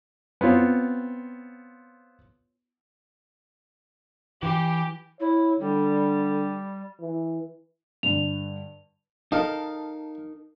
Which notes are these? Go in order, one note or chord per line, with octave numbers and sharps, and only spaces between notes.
B3 C4 F4 C#5
E3 G4
E4 C#5
D3 G3
E3
G2 D3 F7
D#4 A4 A#4 F5 A5